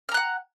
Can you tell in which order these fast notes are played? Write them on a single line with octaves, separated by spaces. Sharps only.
F6 A#5 F#6 F#5